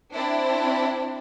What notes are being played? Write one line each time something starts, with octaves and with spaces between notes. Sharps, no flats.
C4 D4 E4